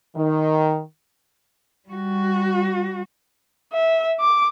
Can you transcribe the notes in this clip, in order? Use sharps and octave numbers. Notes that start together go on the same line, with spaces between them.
D#3
G3 F#4
E5
D6